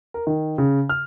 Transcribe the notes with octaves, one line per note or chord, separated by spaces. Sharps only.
A#4
D#3
C#3
F6